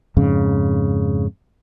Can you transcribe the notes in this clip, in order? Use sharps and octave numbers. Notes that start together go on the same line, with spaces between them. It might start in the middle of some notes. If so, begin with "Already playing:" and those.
F2 G#2 C#3